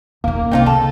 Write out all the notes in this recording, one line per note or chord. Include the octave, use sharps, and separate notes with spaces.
D#1 A#3 C#4
C2 C4 D#4 F4
C#3 A4